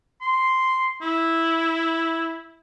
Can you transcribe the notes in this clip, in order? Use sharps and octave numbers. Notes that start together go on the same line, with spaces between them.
C6
E4